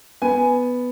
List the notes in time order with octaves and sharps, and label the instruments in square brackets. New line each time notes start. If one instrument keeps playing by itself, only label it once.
[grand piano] B3 G#5